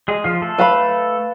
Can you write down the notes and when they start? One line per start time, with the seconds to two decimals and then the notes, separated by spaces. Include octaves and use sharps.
0.08 G#3 G#4
0.24 F3 F4
0.42 A3 A4
0.58 B4 F5 B5